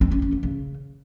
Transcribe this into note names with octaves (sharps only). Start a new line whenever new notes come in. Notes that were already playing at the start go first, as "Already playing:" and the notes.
C4
C#4
C#4
A3
C#3